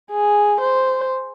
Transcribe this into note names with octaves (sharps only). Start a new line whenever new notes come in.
G#4
C5